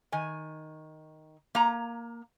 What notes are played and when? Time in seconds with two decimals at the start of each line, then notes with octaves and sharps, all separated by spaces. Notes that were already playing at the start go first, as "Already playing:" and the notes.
0.12 D#3 G#5
1.55 A#3 A#5